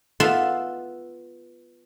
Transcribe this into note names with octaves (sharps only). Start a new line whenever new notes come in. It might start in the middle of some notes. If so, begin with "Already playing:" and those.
B3 F4 A4 E5 F5